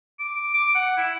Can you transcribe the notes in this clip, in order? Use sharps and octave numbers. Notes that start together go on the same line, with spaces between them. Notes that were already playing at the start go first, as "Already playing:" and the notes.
D6
D6
F#5
E4